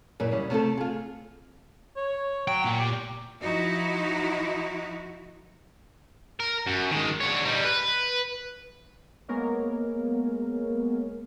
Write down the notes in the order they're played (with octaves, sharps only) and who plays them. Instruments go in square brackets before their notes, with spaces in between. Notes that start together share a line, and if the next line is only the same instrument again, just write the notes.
[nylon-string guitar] F#2 A#2 E4 B4
C#3 G3
C3 A3 C4 A4
F4 G#4
[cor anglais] C#5
[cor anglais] F#3 [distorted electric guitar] G5
[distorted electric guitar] A#2
[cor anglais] G4
[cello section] F3 D#4 E4 F#4
[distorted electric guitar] A#4
F#2
D#3 G#3
D3 C#5
G3 D#4
B4
[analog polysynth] G#3 A#3 B3 A#4 C#5